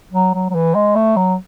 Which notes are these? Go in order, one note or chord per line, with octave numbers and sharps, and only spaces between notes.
F#3
F#3
F#3
E3
G#3
A3
F#3